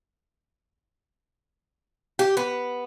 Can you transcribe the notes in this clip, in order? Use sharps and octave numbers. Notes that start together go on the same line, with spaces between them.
G4
B3